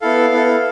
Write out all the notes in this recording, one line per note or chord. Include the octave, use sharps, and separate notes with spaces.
B3 E4 A4 F5
B3 E4 A4